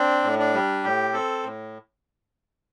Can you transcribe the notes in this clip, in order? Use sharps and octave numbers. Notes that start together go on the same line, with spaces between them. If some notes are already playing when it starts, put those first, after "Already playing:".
Already playing: C4 D4
A2
D4
G3
A2 G4
C4 A4
A2